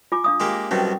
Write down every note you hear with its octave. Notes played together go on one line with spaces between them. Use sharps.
F4 G#5 D6
D4 F5 D#6
G#3 A#3 G4
C2 B2 F#3 C#4 G5